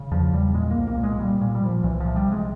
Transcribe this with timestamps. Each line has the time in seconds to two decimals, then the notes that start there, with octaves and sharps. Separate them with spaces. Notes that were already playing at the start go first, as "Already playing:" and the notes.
Already playing: C#3
0.11 E2 F3
0.33 E2 G3
0.54 A#2 G#3
0.71 A#3
0.77 C2
0.87 A#3
0.97 A#2
1.03 G#3
1.19 A#2 G3
1.41 A#2
1.55 G3
1.62 A#2 F3
1.83 C2 E3
2.00 C3 F3
2.16 G3
2.27 C2 G#3